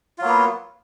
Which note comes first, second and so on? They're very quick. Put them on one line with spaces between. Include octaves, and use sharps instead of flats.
F4 F#3 A#3 B3